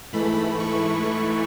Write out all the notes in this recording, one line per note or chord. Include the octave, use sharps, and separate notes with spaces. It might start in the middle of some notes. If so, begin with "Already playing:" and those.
G#2 E3 A3 B5
C#6